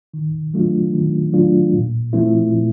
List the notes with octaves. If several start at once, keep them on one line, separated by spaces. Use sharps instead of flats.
D#3
F#3 A3 D4 F4
D#3
F#3 A3 D4 F4
A#2
F3 A3 C4 E4
A#2